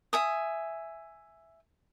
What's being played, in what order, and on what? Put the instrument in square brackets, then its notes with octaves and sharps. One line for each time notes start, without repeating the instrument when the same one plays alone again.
[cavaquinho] E5 G#5 D#6